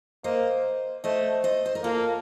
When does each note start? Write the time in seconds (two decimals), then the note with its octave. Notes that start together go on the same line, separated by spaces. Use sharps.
0.24 A#3 C5 D#5
1.04 A3 C5 D#5
1.44 C5 D#5
1.66 C5
1.75 A#4
1.84 A#3 F4 A4